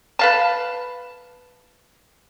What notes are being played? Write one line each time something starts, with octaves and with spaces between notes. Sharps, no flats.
B4 F5 A5